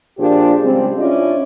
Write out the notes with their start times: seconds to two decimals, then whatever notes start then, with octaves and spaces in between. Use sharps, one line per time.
0.19 A#2 F3 D4 F4 G4 G#4
0.63 C#3 G3 G#3 C4
0.98 C#4 D4 E4 F4 D5 D#5